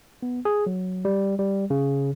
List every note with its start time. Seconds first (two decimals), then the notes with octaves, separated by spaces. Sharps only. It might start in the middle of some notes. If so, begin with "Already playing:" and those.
0.23 B3
0.45 G#4
0.66 F#3
1.05 G3
1.39 G3
1.70 C#3